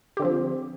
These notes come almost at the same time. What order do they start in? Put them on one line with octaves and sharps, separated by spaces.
G4 D3 C4 F3